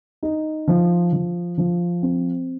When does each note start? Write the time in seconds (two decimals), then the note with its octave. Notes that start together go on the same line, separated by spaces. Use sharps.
0.23 D#4
0.68 F3
1.13 F3
1.58 F3
2.02 C4